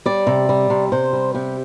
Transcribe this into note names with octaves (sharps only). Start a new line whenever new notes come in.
G3 D5
C3
G3
C3
C3 C5
G3
C3 G4